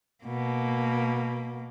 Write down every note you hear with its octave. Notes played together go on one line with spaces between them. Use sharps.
B2 A#3